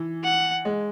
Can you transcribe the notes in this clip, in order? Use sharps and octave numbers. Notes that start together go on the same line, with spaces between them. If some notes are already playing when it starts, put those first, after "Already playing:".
Already playing: E3
F#5
G#3